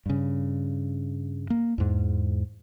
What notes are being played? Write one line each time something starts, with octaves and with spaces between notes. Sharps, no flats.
G2 C#3
A#3
E2 G#2